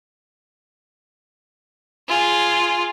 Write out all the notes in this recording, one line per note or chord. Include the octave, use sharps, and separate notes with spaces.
F4 G#4